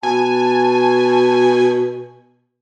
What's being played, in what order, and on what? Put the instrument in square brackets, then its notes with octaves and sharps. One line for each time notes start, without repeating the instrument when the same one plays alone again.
[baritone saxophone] B2 [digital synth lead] G#5 [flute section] A5